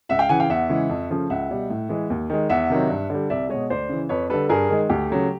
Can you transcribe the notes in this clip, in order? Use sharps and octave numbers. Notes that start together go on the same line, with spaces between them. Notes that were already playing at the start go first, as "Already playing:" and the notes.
C#2 E5 F#5
F5 G5
C#3 E3 F#5 G#5
F5 G5
E2 E5 F#5
C#3 E3 G#3
F2
C#3 F3 A3
C#2 E5 F#5
B2 G3
A2
E3 G#3
D#2
D#3 G#3
E2 E5 F#5
C3 D#3 F#3
G2
D3 G3
C2 D5 E5
B2 G#3 C#5 D#5
D2 C5 D5
C#3 E3
F2 B4 C#5
D3 G3 A4 B4
G2 G#4 A#4
D#3 G#3
D2 G4
C#3 F#3 A3